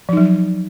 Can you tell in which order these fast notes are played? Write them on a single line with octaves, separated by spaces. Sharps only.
F3 D#4 F#3